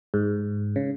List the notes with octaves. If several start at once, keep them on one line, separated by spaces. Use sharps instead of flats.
G#2
C#3